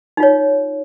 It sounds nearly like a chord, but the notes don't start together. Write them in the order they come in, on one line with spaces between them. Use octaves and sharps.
D#4 F4 C#5